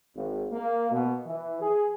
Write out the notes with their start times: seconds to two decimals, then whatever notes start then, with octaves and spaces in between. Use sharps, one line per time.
0.14 G#1
0.51 A#3
0.90 B2
1.25 E3
1.61 G#4